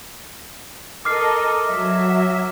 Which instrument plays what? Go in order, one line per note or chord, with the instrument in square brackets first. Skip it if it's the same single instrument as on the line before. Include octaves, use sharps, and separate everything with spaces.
[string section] A4 A#4 D#5 [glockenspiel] D6 F6 C7
[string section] F#3 E5